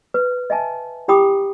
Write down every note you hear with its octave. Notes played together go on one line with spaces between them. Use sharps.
B4
D#5 E5 G#5 A5
E4 G4 G5 B5 D6 D#6